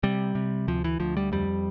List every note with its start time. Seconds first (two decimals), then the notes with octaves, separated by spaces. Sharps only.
0.03 C3 G3
0.35 C3
0.67 D2 F3
0.84 E3
1.00 D2 F3
1.17 G3
1.32 F2 G3